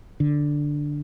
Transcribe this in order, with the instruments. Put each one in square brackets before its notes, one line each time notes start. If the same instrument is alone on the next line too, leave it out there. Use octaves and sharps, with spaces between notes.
[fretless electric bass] D3